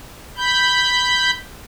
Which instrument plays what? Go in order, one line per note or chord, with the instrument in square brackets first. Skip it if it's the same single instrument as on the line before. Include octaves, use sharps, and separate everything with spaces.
[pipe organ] B5 G6